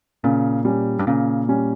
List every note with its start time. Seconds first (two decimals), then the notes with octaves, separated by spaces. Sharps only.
0.24 A#2 C#3
0.65 G3 C#4
0.99 G2
1.07 A#2 C#3
1.49 G3 C#4